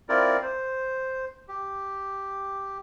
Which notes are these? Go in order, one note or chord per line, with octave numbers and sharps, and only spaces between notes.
C4 E4 F4 A#4 D5
C5
G4